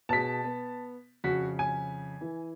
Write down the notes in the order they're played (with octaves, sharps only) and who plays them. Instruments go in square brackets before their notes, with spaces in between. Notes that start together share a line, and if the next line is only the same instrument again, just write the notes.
[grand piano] B2 G#4 [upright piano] A5 B6
[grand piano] B3
[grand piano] F2 C#3 B6 [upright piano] F#4
[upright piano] G#5
[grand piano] E3